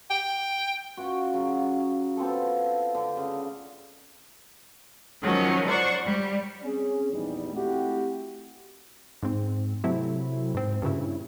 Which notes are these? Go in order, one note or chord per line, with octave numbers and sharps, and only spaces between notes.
G5
C#4 F4 F#4
C#3 F#3
B3 C4 F4 A4
D3
C#3
D#3 F3 F#3 C#4
C5 D5 F#5 C#6
G3
C4 C#4 G#4
A#1 E2 G3 D#4
A3 C4 E4 F#4 G4
G#2 C4
C3 F#3 A3 C4 E4
G#2 C4
G2 A#2 C#3 E4